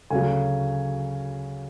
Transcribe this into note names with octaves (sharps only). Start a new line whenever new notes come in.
D2 C#3 F#3 G#5